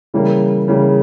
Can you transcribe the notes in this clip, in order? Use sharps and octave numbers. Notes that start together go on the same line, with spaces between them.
C#3 E3 G3 A#3
C#3 E3 G3 A#3